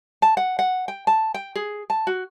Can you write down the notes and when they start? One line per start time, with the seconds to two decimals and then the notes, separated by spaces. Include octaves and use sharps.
0.22 A5
0.37 F#5
0.59 F#5
0.88 G5
1.07 A5
1.34 G5
1.55 G#4
1.90 A5
2.07 F#4